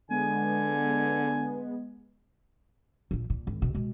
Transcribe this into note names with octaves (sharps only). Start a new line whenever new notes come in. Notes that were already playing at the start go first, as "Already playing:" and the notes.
D3 G#3 B3 G#5
A#1 F3
A#2
G#1
B2
B2 G#3